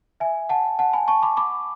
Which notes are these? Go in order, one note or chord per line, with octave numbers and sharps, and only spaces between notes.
E5 G#5
F#5 A5
F#5 A5
G#5 B5
A5 C#6
B5 D6
B5 D6